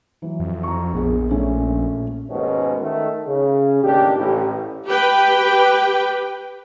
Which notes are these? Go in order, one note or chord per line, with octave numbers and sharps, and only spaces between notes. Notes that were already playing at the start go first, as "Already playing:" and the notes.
E3 F#3
F2
A#5 C#6
A#1 B3 G#4
A#2 A3 C#4
D#2 G#2 B2 A#3 B3 C#4
D#3 A3
C#3
A1 D#2 D4 G4
A1
G4 B4 G5